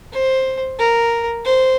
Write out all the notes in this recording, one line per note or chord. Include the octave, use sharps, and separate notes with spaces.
C5
A#4
C5